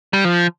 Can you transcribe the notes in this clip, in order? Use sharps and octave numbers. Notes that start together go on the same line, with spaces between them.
G3
F3